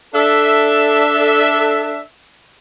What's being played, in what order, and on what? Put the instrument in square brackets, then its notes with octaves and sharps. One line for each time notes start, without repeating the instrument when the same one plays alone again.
[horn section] D4 A4 E5